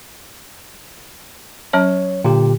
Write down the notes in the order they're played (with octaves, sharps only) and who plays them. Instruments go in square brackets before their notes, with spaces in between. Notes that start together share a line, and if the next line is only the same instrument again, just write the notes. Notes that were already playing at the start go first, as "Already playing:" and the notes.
[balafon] F#3 C#4 A5 [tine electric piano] C#5
[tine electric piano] A#2 D3 G4